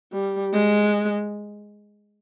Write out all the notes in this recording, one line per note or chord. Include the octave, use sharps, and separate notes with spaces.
G3
G#3